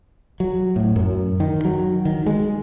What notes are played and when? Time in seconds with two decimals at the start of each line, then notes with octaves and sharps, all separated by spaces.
0.40 F#3
0.76 A2
0.96 F#2
1.40 D#3
1.65 F#3
2.05 D#3
2.26 G#3